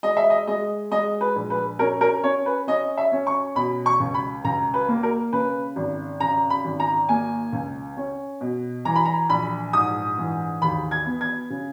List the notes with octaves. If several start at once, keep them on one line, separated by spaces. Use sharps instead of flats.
G#3 D#5
E5
D#5
G#3 D#5
G#3 D#5
B4
A#1
B4
C#4 A#4
A#4
C#4 C#5
B4
C#4 D#5
E5
C#4
C#6
B2 B5
C#6
C#2
B5
C#2 A#5
B4
A#3
A#4
C#3 B4
G#1
C#3 A#5
B5
G#1
A#5
A#3 G#5
C#2
C#4
B2
E3 A#5
B5
A#5
A#1 B5
G#2 D#6
E3
D#2 B5
G#6
B3
G#6
C#3